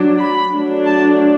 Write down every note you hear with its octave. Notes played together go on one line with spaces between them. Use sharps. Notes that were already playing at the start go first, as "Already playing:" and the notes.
Already playing: F#3 D4
B5
F#3 A3 D4
A5